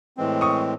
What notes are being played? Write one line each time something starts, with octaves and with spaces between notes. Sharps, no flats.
A2 E3 G#3 C4
C#6 D#6